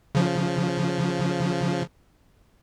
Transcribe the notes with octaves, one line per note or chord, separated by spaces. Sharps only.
C#3 F3